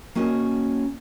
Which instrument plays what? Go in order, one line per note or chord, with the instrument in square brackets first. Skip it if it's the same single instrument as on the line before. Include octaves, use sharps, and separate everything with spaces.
[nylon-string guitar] A#3 C#4 F#4 D#5